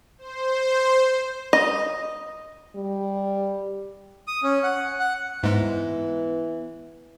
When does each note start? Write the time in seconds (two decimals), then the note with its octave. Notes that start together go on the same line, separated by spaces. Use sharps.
0.18 C5
1.53 D#5
2.76 G3
4.27 D#6
4.43 C#4
4.63 F#5
5.00 F#5
5.43 G#2 E3 G#3 B3